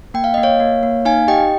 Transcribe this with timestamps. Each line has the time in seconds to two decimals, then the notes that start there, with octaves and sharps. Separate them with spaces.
0.14 A#3 G5
0.24 F5
0.34 A#3 D#5
0.43 C#5 F5
0.60 A#3
0.83 A#3
1.05 D#4 F5 G#5
1.28 G4 D#5 G5